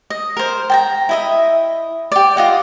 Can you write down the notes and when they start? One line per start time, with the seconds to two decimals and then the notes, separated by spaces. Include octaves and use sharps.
0.10 D#5
0.37 A#4 C5
0.70 G5 A5 A#5
1.09 E4 D#5 E5
2.12 G4 D5
2.37 F4 D#5 F#5